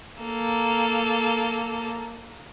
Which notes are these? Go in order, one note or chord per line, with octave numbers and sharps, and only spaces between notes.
A#3 A4